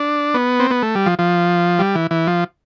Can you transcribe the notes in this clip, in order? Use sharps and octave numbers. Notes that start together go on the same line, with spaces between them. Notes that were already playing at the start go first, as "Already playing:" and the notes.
Already playing: D4
B3
C4
B3
A3
G3
F3
F3
G3
E3
E3
F3